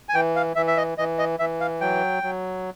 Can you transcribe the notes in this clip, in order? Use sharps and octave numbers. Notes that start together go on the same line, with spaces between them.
G#5
E3 G5
F5
E3 E5
E5
D#5
E3 D#5
D#5
E3 E5
F5
F#3 G5
F#3